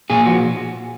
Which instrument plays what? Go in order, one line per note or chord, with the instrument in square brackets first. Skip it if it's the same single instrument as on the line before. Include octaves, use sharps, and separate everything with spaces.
[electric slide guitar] A#2 G#4
F3 F#4